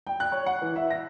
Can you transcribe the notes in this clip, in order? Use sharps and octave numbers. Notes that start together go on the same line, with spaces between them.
G5
F#6
C#5
F#5
E3
E5
A#6